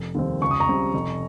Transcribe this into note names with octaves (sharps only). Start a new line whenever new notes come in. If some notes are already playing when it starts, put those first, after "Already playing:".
Already playing: F1
D#2 D#3 G3 C4
C#2 C#6
D#6
A#5 C#6
C#3 G3 C4
F1